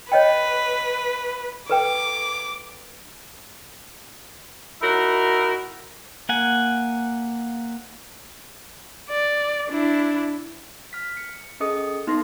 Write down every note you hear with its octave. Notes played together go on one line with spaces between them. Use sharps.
B4 C#5 D#5 G5
A4 B4 G5 D6
D#4 E4 F#4 A#4
A#3 F#5 G#5
D5
D4 E4
F6 B6
C#7
C#4 G#4 A4 D#5 D#6 C#7
B3 D#4 A4 C6 A#6